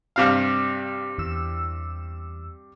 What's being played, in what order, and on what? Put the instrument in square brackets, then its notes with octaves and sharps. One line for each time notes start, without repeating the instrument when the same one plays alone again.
[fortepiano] G2 C3 F5
[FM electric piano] E2 E6